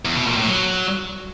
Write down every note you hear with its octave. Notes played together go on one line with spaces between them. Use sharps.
E2
B2
A#2
A2
F#3